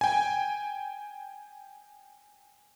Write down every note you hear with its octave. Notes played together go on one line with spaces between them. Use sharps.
G5 G#5